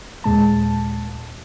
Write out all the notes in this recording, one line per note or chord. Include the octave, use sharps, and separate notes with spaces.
D#2 A#2 G#3 A5